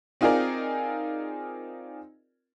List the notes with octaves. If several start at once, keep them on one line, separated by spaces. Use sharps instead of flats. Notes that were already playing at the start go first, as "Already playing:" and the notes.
C4 D#4 F4 G#4 A#4 D5